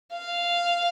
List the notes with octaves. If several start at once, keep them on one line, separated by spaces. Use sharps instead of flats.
F5